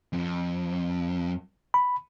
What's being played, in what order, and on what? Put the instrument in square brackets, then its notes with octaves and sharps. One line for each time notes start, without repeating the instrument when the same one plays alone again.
[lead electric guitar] F2
[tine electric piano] B5